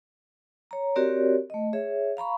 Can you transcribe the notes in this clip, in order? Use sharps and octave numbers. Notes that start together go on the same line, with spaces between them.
C#5 A#5
C4 F#4 G4 A#4 C#5 D5
A3 D#5
G#4 C#5 E5
F5 A#5 B5 C#6